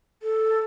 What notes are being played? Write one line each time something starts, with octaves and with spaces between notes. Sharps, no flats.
A4